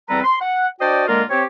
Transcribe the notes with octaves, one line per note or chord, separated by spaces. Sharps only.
E2 G3 C4 A4 B4 A#5
C6
F#5
D4 F#4 C5 D5 D#5 G5
D3 G#3 A#3 F4 A#4
C4 G4 C#5